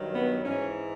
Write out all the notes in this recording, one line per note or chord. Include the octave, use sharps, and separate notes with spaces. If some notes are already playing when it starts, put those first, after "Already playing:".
Already playing: G2 D#3 F#3
B3
G#2 E3 C#4